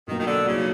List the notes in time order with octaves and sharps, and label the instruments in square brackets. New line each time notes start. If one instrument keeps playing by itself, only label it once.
[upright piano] B2 F#3 A#3 [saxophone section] D#3
[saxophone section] D#3
D3
[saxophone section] C#3 [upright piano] F#3 A#3 D#4